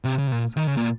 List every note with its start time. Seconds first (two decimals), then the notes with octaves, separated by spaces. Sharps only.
0.05 C3
0.19 C#3
0.27 C3
0.32 A#2
0.57 D#3
0.67 C#3
0.77 A#2